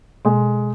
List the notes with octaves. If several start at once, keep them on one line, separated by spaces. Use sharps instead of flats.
B2 G#3